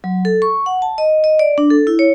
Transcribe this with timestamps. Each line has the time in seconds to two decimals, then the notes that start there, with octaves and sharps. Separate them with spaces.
0.04 F#3
0.25 A4
0.42 C#6
0.66 F#5
0.82 A5
0.98 D#5
1.24 D#5
1.39 D5
1.58 D4
1.70 A4
1.87 E4
1.99 C#5